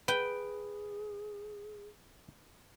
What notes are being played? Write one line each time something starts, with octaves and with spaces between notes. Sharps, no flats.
G#4 B4 G5